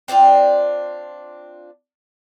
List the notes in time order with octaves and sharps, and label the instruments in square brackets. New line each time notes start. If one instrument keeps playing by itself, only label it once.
[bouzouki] C4 D4 E4 F4